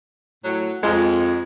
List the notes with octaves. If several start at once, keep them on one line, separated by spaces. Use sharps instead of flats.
A2 F#3
F2 G#3